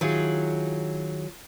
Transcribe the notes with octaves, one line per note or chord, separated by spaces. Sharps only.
D#3 F#3 E4 F4 G#4